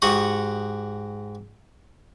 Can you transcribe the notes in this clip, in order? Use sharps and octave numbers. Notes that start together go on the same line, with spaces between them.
G#2 F#4 G4 F#5 C#6 D#6